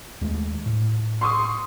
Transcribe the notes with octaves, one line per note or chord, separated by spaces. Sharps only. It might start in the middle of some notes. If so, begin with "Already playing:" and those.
D#2 G#3 A3
A2
C6 C#6 D#6